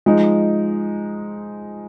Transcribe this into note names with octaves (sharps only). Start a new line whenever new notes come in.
F3 G#3 D#4